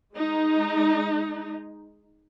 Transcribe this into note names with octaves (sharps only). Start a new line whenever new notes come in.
G#3 D#4